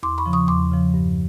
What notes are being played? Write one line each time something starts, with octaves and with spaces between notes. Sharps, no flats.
E2 C6 D6
B5 C#6
C#3 F3
C#6 D#6
E2 C6 D6
C#3 F3
G2